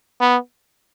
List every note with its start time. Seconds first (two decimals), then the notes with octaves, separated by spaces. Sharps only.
0.21 B3